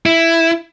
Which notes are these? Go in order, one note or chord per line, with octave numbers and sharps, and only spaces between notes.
E4